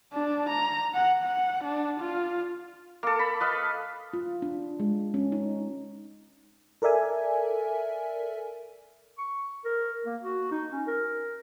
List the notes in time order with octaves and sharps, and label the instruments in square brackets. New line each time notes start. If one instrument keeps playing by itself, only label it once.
[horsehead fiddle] D4
A#5
F#5
F#5
D4
F4
[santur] A#3 A4
B5
B4 D#5 F5
[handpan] F4
D4
G#3
C#4
D#4
[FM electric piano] A4 A#4 D5 E5 G#5
[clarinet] C#6
A#4
A#3
F#4
D#4
C#4
A#4